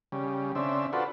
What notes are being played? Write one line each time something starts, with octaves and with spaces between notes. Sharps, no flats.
C#3 G3
C#3 C4 D4 E5
D4 F4 F#4 A4 B4 C5